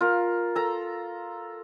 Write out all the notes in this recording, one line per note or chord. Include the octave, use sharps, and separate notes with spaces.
F4 A#4
A4 A#5